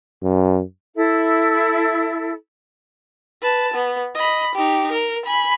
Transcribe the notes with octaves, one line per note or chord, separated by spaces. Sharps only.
F#2
E4 A4
B4 A5
B3
D#5 B5
D#4 G4
A#4
G#5 B5